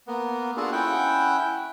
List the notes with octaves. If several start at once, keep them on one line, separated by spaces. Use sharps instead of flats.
A#3 B3
D4 F4 F#4 G#4 A4
C#4 E4 F#5 G5